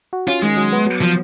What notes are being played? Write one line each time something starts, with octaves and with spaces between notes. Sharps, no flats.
F#4
C#4 F4
D#3 G#3
F#3
B3
F#3
F3